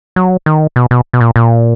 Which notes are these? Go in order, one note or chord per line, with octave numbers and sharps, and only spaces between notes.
F#3
D#3
B2
B2
B2
A#2
A#2